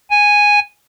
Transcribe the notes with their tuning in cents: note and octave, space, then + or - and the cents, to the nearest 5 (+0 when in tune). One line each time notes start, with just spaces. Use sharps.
G#5 -5